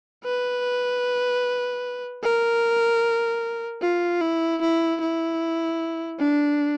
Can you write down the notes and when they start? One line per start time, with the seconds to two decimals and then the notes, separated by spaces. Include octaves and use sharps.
0.24 B4
2.23 A#4
3.82 F4
4.21 E4
4.61 E4
5.01 E4
6.20 D4